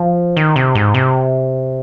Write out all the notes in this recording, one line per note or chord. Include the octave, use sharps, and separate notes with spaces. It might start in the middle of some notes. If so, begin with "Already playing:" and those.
Already playing: F3
D#3
C3
G#2
C3